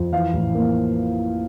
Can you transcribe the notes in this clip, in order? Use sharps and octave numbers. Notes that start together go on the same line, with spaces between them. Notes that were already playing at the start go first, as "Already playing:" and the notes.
Already playing: F2
E3 F5
A1
A#3